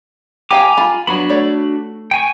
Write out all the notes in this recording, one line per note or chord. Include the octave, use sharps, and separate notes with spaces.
G4 F5 G5 G#5 A#5 D6
F4 B5
F#3 B3 D4 F#4 B5
A3 C#5 D5
G5 G#5 C#6